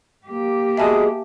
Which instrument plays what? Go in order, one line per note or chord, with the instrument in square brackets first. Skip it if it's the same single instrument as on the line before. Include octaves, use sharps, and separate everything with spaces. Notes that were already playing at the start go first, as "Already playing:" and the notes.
[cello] A#3 G4
[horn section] B2 G#3 [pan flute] G#4 [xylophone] E5 G#5 A5